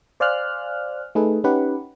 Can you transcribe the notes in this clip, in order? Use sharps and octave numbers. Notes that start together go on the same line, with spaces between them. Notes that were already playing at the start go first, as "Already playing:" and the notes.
C5 D5 F5 G#5 F6 F#6
A3 D#4 G#4 A4 B4
C#4 D#4 G4 B4 F#5